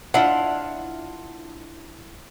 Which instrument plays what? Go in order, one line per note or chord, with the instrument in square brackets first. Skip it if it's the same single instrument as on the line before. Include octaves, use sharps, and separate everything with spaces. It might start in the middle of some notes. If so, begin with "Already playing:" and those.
[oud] D4 E4 [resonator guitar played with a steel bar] F4 F#5